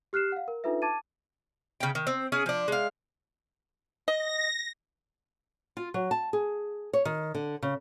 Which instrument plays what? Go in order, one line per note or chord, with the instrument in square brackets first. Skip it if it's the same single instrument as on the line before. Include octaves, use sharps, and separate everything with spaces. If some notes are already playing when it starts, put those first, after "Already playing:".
[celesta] G4 F6 F#6 C7 E7
F5 F#5
A#4
D4 D#4 F4 A4 B4 E5
A5 D6 G#6 A6 D#7
[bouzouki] C#3 G5
D#3
C4
C#4 G#4 G#5
F3 D4
G#3 F5
[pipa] D#5 [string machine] A#6
[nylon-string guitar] F4
F#3
A5
G#4
C#5
D#3
D3
C#3